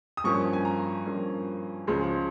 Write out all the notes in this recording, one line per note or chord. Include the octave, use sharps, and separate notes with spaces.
D#6
G2 F3 A#3 C#4 C#6
G#5
A#5
G2 F3 A#3 C#4
C#2 C#3 F3 G#3